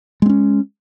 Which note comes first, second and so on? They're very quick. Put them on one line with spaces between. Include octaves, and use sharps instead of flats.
G#3 C4 C#4